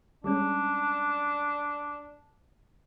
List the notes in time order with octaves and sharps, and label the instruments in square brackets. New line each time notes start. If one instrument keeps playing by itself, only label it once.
[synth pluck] G3 G#3 C#4 [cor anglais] D4